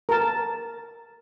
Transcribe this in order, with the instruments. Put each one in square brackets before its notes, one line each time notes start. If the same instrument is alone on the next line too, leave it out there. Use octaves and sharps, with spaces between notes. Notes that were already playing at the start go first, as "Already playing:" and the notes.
[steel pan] A#4 A5